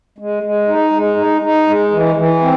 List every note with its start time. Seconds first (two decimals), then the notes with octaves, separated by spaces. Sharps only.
0.18 G#3
0.43 G#3
0.68 D#4
0.92 G#3
1.17 D#4
1.42 D#4
1.67 G#3
1.91 E3
2.16 E3
2.41 C4